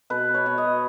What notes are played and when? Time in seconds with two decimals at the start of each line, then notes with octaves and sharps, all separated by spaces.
0.10 B2 B4
0.34 C#5
0.46 B2
0.58 D#5